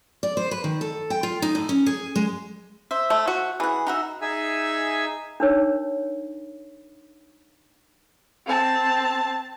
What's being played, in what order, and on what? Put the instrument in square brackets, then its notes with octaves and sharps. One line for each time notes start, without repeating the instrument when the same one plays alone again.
[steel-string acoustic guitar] D5
C5
B4
D#3
A4
G5
F4
D#4
A2
C#4
G#4
G#3
[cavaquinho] C5 E5
[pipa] A3
F#4
[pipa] E3 [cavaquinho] G#4 F#5
[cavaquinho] D#4 F#4 E5
[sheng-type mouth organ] D#4 G#4 E5 G#5 E6
[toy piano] D4 D#4 A#4 C#5
[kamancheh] C4 A5